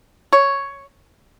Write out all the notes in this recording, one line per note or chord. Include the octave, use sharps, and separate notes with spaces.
C#5